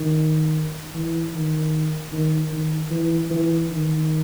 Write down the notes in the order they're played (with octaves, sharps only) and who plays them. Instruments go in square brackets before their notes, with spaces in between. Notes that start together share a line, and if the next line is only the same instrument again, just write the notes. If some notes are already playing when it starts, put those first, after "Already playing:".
Already playing: [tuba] D#3
E3
D#3
D#3
D#3
E3
E3
D#3